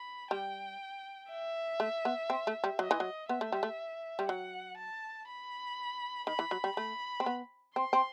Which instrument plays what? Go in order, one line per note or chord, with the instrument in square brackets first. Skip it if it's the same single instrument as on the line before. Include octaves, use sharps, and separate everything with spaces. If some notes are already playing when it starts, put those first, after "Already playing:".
Already playing: [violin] B5
[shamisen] G3 [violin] G5
[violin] E5
[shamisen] A3
B3
C4
A3
G3
[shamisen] F#3 [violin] D#5
[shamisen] E3
F#3
[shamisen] B3 [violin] E5
[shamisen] A3
G3
A3
G3
[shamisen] F#3 [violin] F#5
[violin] A5
B5
[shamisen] D#3 [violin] B5
[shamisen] E3
F#3
G3
[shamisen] A3 [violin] B5
[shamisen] C4
B3
[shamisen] C4 [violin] C6
[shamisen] C4